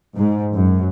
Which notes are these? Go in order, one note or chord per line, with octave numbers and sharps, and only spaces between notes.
G#2
F#2